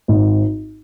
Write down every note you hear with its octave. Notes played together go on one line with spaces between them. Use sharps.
G#1